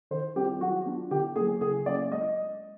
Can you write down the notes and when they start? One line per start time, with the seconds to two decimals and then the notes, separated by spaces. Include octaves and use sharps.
0.11 D#3 C5
0.36 G3 C4 F4 G4 G#4
0.61 F#3 F#4
0.86 B3 D4 F4
1.11 D3 G4
1.36 F#3 A#3 G#4
1.61 C#3 G#4
1.86 F#3 A#3 C#4 D5
2.12 G#3 D#5